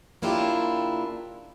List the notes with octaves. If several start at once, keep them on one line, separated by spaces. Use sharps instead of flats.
C#3 A#3 D4 E4 F4 G4